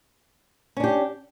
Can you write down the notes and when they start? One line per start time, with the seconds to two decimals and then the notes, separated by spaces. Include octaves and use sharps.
0.77 C#4
0.80 D4
0.84 G4